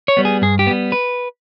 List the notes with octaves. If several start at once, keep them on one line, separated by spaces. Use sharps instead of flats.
C#5
G3 B3
G#4
G2 G#4
G4
G3 B3
B4